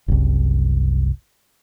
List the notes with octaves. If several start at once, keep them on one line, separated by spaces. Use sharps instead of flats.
F#1 C2